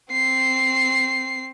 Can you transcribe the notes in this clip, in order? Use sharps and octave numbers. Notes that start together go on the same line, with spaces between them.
C4 C7